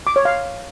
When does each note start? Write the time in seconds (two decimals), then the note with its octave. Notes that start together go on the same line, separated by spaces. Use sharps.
0.07 D6
0.16 C#5
0.25 F5